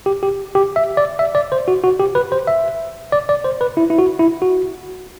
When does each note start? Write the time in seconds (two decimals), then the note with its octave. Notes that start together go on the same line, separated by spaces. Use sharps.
0.06 G4
0.23 G4
0.55 G4
0.76 E5
0.97 D5
1.19 E5
1.35 D5
1.52 C5
1.68 F#4
1.84 F#4
2.00 G4
2.15 B4
2.32 C5
2.47 E5
3.12 D5
3.29 D5
3.45 C5
3.61 B4
3.77 E4
3.90 E4
3.99 F#4
4.19 E4
4.42 F#4